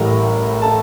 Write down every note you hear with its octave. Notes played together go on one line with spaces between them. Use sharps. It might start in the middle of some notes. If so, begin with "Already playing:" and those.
Already playing: A1 A2 E3 G3 A#4 A#5
A4 A5